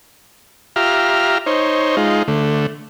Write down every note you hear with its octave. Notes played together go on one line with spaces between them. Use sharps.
F4 G4 E5 A#5 F6
D#4 C5 C#5
G#3 D#4 F4
D3 A3